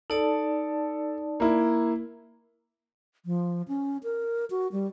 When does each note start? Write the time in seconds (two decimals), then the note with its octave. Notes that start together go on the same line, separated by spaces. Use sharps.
0.10 D#4 A4 D5 A5
1.40 A#3 E4
3.26 F3
3.68 C#4
4.03 A#4
4.50 F#4
4.72 G3